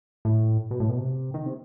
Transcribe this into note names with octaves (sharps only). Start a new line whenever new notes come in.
A2
B2
A2
B2
C3
D#3
C3